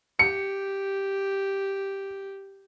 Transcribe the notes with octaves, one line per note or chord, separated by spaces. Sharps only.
G4 C#7